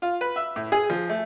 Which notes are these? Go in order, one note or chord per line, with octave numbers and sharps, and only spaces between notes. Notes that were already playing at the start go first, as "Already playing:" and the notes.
F4
B4
E5
A2
G#4
F3
A3